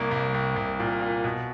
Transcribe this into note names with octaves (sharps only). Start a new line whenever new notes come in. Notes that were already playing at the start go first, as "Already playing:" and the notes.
Already playing: C2 A#3
C2
C2
C2
A#2
A#2
B2